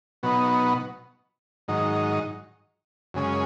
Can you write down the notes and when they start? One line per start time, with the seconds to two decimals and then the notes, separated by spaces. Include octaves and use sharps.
0.23 B2 F#3 B3 D#4
1.68 G#2 D#3 F#3 D#4
3.14 F#2 C#3 G#3 C#4